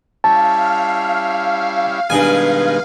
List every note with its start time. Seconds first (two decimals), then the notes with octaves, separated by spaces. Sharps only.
0.24 G3 C#4 E4 F5 A5
2.10 G2 B2 D#3 G#3 G#5